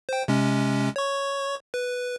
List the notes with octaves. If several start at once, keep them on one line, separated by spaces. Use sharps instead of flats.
C5 G5
C3 G#3 C#4
C#5 C#6
B4